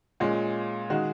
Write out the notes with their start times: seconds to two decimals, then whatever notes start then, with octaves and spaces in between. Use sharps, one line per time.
0.20 A#2 G#3 C#4
0.90 D#3 G#3 D#4 F#4